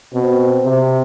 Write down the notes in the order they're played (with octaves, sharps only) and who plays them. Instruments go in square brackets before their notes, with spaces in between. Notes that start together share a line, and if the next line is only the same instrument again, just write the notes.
[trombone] B2 [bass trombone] C4
[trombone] C3